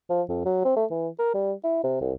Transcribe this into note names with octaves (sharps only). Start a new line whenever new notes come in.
F3
F2
F#3
C4
A3
E3
A#4
G3
E4
C3
C2